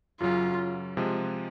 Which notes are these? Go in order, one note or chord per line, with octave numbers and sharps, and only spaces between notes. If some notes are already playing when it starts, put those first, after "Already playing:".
F#2 C#3 F#3 F4
C3 F3 G#3